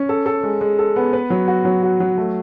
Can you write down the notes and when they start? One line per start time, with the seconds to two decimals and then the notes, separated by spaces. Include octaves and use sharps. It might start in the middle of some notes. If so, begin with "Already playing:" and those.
Already playing: C#4
0.09 A4
0.26 A4
0.43 G#3
0.61 G#3
0.79 A4
0.96 B3
1.13 B4
1.30 F#3
1.48 F#4
1.65 F#3
1.83 F#4
2.00 F#3
2.18 A3